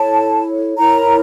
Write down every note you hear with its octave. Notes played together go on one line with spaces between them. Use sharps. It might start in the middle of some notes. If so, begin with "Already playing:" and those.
Already playing: E4 A4 C#5 A5
E4 A#4 C#5 A#5